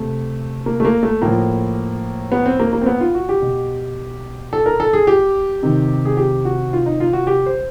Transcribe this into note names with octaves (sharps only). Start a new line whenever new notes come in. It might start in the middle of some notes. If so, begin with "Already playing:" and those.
Already playing: C3 A3
A#3
A3
A#3
A3
A2 F3 A#3
B3
C4
A#3
A#3
C4
B3
F4
F#4
G4
B2
A4
A#4
A4
G#4
G4
C3 D#3
G#4
G4
F#4
F4
D#4
F4
F#4
G4
C5